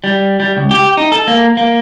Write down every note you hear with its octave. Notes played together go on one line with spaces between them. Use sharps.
G3
G3
C#2
G4
D#4
A4
A#3
A#3